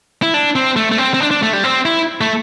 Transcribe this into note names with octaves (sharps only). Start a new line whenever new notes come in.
E4
D4
C4
A3
A3
C4
C4
D4
D4
A3
G3
C4
E4
A3